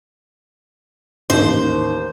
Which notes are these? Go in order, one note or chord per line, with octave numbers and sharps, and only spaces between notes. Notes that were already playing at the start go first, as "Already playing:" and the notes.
A1 D#2 D#3 C5